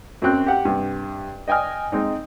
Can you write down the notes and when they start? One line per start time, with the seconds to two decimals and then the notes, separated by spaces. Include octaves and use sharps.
0.22 F#2 F#3 C4 F#6
0.46 G4 F#5 G5
0.65 G2 C3
1.48 D#5 G5 G#5 D#6 F6
1.92 G#3 C4 D#4